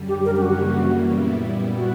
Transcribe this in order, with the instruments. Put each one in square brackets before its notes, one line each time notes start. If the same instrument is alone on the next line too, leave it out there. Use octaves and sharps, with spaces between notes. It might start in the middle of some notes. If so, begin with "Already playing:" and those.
Already playing: [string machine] F#2 D3 G3
[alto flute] G4
A#4
G4
[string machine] F#2 C#3 E3 G3 A#3 [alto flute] F#4
[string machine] A#2 G3 B3 E4
[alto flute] F#4